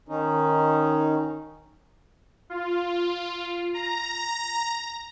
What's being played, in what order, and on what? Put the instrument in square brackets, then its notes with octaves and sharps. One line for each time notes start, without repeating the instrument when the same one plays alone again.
[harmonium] D#3 C#4 D#4
[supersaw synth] F4
A#5